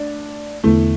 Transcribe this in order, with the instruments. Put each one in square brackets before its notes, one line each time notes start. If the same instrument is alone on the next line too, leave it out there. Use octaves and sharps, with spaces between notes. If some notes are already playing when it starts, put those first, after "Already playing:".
Already playing: [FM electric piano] A3 [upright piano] D4
[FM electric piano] E2 D3 B3 E4 [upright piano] A3